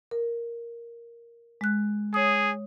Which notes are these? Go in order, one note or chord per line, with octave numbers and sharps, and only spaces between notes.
A#4
G#3 F#6
G#4 C#5 D#6